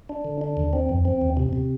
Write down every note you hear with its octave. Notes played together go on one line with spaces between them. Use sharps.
D4
D3
D4
D#2
C4
F2
C4
D#2
C3
C3